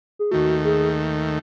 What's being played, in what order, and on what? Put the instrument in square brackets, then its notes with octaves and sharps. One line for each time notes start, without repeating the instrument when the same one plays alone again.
[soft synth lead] G#4
[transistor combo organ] D#2 D#3 A3 [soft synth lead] F#4
[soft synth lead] G#4